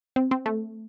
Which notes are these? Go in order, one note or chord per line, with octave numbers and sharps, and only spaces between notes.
C4
C4
A3